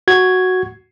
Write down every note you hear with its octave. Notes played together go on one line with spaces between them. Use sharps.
F#4 G#6